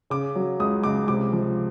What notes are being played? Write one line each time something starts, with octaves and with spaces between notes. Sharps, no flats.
C#3 D6
F#3
C#2 D#6
C#2 D6
C3 D6
F3